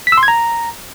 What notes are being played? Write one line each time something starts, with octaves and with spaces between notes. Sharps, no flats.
B6
E6
C6
G#6
A#5